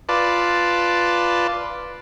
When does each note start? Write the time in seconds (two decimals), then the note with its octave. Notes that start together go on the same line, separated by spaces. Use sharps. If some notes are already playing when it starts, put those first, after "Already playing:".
0.09 F4 B4 D5 A5